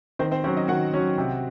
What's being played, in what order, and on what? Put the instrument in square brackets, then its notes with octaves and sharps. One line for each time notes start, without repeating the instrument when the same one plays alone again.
[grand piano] D#3 [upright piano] C4 C5
[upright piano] C4 C5
[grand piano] F#3 C#4 [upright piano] C4 C5
[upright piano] D#4 D#5
[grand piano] D#3 [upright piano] F#4 F#5
[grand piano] F#3 C#4
C3